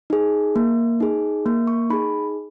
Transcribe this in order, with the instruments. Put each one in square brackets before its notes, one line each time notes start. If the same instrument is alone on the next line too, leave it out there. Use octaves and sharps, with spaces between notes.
[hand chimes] D#4 G#4
A#3
D#4 G#4
A#3
C#6
D#4 B5
G#4